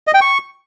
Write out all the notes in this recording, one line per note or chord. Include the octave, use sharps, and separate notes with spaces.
D#5
G5
C#6